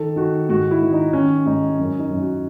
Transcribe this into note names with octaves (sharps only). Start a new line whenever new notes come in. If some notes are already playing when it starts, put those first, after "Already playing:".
Already playing: D#3 A4
D#3 F#4
G#2 F#4
E4
D#3
D#4
D#3 C#4
G#2 D#4
F#2 C#4
D#4
F#2
F#4